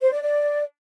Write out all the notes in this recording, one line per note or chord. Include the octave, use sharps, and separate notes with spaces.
C5
D5
D5